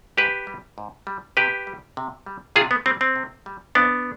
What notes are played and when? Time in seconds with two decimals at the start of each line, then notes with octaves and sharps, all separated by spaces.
0.17 G#2 G4 B4
0.47 G3
0.78 G#2
1.07 G3
1.37 C3 G4 B4
1.67 G3
1.97 C3
2.26 G3
2.56 C3 F4 G#4
2.71 B3
2.86 G3 C4
3.01 C4
3.16 C3
3.46 G3
3.75 F2 B3 D4